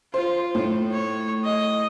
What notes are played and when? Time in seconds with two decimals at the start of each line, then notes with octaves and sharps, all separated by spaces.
0.14 F4 C5
0.55 A2
0.92 C#5
1.44 D#5